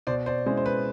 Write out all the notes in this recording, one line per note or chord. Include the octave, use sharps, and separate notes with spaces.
B2 C5 D5
C5 D5
G#3 C#4 E4 C5
C5
B4